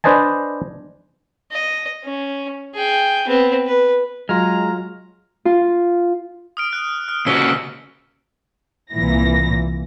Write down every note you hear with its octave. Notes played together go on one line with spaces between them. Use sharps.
D4 B4 C5 D#5 G#5 A5
D#5
C#4
G#4 G5
B3 C4
B4
F#3 G#3 F4 A#5 F6
F4
D#6 F6 D7
F#6
F6
A#2 C#3 F#4 E6 B6 G7
C2 A#2 E3 A#6